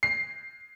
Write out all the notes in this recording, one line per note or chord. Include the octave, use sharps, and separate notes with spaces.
C7